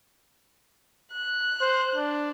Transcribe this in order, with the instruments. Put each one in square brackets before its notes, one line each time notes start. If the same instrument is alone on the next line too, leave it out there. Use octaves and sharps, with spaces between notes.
[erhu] F#6
[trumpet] C5
D4